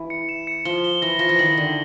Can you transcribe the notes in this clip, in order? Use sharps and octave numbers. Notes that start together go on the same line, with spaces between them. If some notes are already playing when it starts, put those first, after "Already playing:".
Already playing: E3
C#7
E7
C#7
F3 G7
G7
E3 A#6
F3 A#6
E3
D#3 F#7
D3 A#6